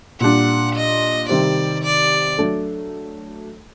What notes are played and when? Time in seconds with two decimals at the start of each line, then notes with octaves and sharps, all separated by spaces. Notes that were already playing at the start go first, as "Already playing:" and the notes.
0.20 A#2 G3 D4 F#5
0.75 D#5
1.29 C3 D#3 G3 C4 D5
1.83 D5
2.38 F#3 A3 D4 A4